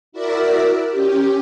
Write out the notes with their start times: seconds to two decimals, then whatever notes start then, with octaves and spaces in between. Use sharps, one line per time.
0.12 E4 F#4 A#4 D5 E5
0.90 C#4 G4